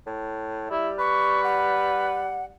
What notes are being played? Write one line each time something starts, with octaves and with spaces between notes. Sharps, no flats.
A2
G3 E4
B4 C#6
F#5